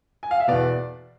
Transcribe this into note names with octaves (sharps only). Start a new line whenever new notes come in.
G#5
F5
E5
E2 B2 B4 D5